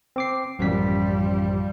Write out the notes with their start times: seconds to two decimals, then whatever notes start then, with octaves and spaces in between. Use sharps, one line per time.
0.16 C4 D6 C7
0.59 A1 F#2 F3 G3 B6